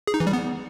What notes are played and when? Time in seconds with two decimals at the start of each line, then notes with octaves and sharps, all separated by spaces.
0.07 G#4
0.14 D#4
0.20 E3
0.27 G3
0.33 B3